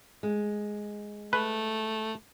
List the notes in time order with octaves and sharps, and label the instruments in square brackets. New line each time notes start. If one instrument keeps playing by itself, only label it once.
[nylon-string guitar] G#3
[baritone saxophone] A3 [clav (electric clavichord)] B4